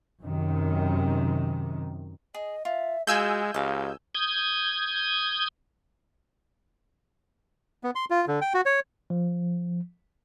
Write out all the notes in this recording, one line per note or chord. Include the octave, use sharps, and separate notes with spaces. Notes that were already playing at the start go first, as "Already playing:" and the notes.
F#2 C3 D#3
G#4 D#5
F4 E5
G#3 F4 F#4 G#4 G#5 E6 G6
C#2 G4 D#5 F5
D#6 G6 G#6
B3
C6
F4
D3
G5
F#4
C#5
F3